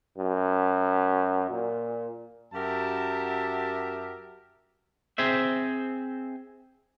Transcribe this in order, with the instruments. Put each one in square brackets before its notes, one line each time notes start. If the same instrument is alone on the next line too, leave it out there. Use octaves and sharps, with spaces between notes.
[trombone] F#2
A#2
[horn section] F#2 F#4 G4 A#4 E5 A5
[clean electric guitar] C4 G#4 C5 E5